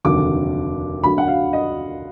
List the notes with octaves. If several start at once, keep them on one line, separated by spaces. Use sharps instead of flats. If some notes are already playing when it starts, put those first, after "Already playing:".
F1 D#2 D3 F#3 D6
D2 D3 F#3 B5
F#5
F5
D#5